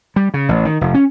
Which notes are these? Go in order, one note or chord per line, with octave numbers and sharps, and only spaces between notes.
G3
C#3
A1
D#3
F1
C#4